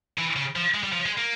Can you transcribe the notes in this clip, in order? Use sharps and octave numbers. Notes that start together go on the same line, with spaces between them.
E3
C#3
F3
G#3
G3
F3
G#3
A#3